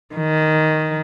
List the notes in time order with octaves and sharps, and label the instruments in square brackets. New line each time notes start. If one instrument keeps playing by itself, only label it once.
[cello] D#3